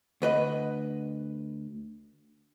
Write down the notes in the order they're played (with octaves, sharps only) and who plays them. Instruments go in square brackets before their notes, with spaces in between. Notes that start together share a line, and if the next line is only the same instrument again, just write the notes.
[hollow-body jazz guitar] D2 B4 D#5